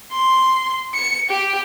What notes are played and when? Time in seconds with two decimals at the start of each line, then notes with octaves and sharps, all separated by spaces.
0.12 C6
0.94 C#7
1.30 G4